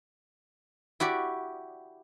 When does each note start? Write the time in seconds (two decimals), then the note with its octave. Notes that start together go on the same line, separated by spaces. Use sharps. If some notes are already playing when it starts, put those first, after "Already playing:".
1.00 E4 F#4 G4 D5